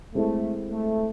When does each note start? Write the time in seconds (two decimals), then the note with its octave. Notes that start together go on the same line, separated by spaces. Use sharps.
0.14 G#3 A3 C4 E4 A4
0.71 A3